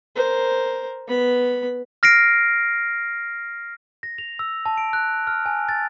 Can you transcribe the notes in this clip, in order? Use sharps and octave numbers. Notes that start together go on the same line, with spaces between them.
A#4 C5
B3 B5
F6 A#6 C7 D7
A#6
F7
E6
A5
D7
F#6
F6
G#5
A6